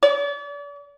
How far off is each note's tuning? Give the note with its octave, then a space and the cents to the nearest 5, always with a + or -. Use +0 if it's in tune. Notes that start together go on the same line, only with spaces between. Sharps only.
D5 -40